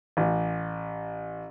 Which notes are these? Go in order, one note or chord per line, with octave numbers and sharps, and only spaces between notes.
A1